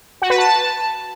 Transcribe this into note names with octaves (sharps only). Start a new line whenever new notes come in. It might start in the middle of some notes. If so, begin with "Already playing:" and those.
F#4
B4
A5